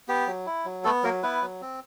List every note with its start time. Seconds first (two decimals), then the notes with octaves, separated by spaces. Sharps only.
0.08 B3 G4
0.27 F#3
0.46 E4
0.65 F#3
0.84 A3 B3 A4
1.03 F#3 A#3 A#4
1.23 B3 E4 B4
1.42 F#3
1.61 C4